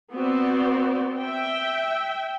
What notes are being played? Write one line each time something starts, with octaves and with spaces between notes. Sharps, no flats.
B3 C4 F#4 C5 D5
E5 G5